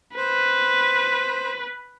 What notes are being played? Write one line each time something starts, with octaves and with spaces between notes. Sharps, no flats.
B4 C5